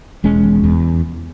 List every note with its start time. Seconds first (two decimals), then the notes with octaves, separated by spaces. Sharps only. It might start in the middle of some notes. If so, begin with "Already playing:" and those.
0.24 E1 G#3 C#4
0.44 E2
0.64 E2